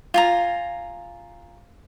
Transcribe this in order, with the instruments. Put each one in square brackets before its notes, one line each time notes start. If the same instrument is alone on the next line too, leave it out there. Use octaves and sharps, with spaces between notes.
[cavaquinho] F4 G#5 A#5